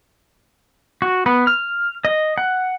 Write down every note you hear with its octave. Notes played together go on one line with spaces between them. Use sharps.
F#4
B3
F6
D#5
F#5